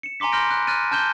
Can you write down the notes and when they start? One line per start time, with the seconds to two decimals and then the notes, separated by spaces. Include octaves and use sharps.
0.03 C#7 E7
0.20 G#5 A#5 C6 D6 B6
0.32 B5 C6 F6 G6 A#6 D7
0.51 F#6
0.67 F6 F#6 A6 D#7
0.91 A5 F6 G6 E7 G7